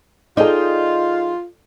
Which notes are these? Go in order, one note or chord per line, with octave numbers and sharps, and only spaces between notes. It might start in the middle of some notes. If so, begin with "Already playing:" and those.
F3 D#4 F4 G#4 A4 D5 D#5 G5